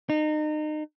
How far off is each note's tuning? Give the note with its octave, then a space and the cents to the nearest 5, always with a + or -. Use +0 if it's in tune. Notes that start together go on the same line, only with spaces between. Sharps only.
D#4 -30